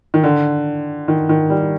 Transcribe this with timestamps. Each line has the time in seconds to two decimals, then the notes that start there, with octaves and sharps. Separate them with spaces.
0.14 D#3
0.24 D3
1.08 D#3
1.29 D#3
1.50 G3